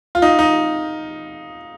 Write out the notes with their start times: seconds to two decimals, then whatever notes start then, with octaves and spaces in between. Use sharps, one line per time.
0.15 F4
0.22 D#4
0.39 D#4